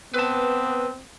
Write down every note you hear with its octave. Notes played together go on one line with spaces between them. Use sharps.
B3 C4 B4 A5